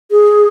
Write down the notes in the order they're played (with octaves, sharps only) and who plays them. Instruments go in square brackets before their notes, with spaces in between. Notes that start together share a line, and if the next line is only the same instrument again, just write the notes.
[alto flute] G#4